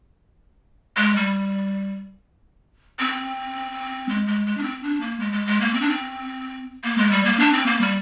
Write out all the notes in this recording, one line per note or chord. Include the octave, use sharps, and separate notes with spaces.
G#3
G3
C4
G#3
G#3
G#3
D4
C4
D4
A#3
G#3
G#3
G#3
A#3
C4
D4
C4
A#3
G#3
G3
A#3
D4
C4
A#3
G3